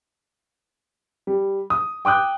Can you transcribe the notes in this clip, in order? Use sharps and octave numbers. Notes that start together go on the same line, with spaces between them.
G3
D#6
G5 D6 D#6 F#6 G6